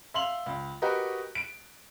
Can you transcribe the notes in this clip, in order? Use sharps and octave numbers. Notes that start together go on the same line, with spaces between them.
E5 F5 C6 F7 F#7
C#2
F#4 G4 A#4 B4 D#5
D7